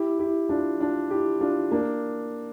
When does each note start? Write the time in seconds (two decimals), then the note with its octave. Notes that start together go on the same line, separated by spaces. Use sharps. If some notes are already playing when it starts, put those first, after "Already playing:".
Already playing: E4 G4
0.19 E4 G4
0.49 D4 F4
0.80 D4 F4
1.10 E4 G4
1.41 D4 F4
1.71 A#3 D4